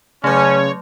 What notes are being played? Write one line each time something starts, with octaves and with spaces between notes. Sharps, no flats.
C#3 F#3 A3 C#4 C#5